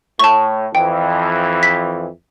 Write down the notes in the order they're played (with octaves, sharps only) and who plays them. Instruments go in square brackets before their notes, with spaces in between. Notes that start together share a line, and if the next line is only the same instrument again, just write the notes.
[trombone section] A2 [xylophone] A5 C#6
[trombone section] F2 E3 [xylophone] G5
[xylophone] B6